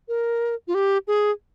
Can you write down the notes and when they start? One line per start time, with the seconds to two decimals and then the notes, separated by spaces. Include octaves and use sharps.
0.08 A#4
0.68 F4
0.74 G4
1.08 G#4